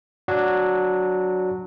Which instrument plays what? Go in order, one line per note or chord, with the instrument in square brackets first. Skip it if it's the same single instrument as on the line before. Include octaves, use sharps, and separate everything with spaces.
[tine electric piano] F#3 D4 F#4